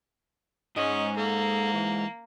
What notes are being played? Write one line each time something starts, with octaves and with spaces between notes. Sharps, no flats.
G#2 C#4 D#5
A#3 A4
E3